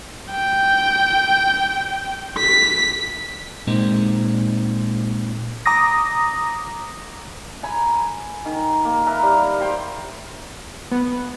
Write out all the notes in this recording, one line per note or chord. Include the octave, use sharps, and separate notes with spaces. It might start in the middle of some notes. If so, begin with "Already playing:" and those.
G5
B6
A#2 G#3 C4 D#4 A#4
A#5 D6 D#6 A#6
G#5 A#5 B5
D#3
A#3
A#4 B4 E5 F5
G3
G4 C5 G5
B3